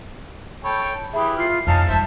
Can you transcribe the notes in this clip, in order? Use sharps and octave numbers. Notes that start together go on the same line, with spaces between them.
A4 C#5 G5 B5 G6
E3 G4 G#4 E5 B5
F4 F6 C7
F2 C#4 D#4 F5 A5
G3 D#4 C5 E5